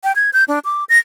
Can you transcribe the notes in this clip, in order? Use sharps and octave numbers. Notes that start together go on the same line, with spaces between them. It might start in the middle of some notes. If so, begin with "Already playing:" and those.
G5
G#6
G6
D4
D6
A#6